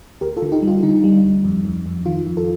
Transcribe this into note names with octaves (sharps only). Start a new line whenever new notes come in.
D2 G4 A#4
F4 A4
D3
D#4 G4
G3
F4
D3 D#4
G3
D2
F2
F2
F2
D#3 F4
F2
F4 A4